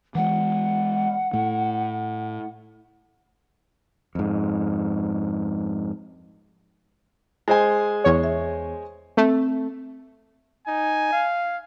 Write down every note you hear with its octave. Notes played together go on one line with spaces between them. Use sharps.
E3 G#3 F#5
A2 A3
F2 G#2
G#3 C5 G#5
E2 C#5
E5
A3 C4
D#4 G#5
F5